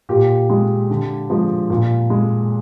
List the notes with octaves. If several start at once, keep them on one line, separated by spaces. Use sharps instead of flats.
A#2 G4
G#3
D3
F3 G#3
A#2
G#3